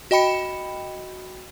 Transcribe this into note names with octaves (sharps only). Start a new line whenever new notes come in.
F#4 D#5 G5 B5 C#7 E7